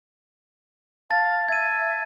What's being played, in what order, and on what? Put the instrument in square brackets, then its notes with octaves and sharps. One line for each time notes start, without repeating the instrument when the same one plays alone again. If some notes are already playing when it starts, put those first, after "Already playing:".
[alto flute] F5 [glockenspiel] A5 A6
[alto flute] E5 [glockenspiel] G#6 D#7